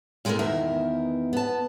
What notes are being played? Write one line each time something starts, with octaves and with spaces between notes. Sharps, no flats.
A2 G#3 A3 B3 E4 A#4
E2 B2 D#3 A#4 E5
B3 A5